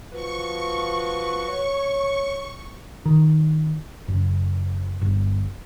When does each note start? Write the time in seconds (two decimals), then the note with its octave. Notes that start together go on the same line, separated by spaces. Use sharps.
0.13 F3 F#4 B4 C#6
1.48 C#5
3.06 D#3
4.08 F#1
5.01 G1